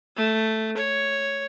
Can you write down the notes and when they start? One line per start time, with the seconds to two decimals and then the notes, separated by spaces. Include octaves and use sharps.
0.17 A3
0.77 C#5